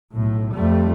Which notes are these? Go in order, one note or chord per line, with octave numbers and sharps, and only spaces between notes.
B1 A2
F2 G3 A3